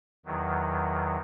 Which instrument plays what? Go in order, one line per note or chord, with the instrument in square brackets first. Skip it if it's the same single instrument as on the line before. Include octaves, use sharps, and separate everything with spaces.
[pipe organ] E2 D#3 F#3